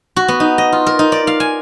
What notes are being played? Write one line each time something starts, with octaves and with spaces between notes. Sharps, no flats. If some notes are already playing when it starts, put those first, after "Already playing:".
F#4
B3
D#4
D#5
F4
A#4
D#4
D5
F5
G#5